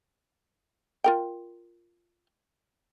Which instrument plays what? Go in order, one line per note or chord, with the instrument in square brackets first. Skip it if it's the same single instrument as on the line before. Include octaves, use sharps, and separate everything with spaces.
[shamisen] F4 A#4 G5